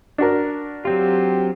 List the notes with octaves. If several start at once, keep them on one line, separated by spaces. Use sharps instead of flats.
D4 F#4 A#4
F#3 C4 F4 G4